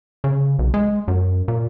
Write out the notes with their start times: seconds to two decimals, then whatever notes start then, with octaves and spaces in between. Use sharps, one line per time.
0.24 C#3
0.59 B1
0.74 G#3
1.08 F#2
1.48 A#2